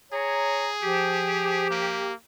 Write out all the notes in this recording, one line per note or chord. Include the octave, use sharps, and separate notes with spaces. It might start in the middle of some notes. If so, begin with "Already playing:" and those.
G#4 C#5 A#5
F3 G4
A#3